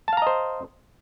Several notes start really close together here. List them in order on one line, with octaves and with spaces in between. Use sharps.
A5 F5 A#5 D#5 C5